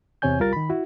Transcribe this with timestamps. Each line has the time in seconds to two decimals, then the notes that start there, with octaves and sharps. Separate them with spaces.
0.22 E2 C3 C4 C#5 G#5 G6
0.39 C2 G3 F4 A#4 A6
0.53 D#3 B5
0.70 E4 F#4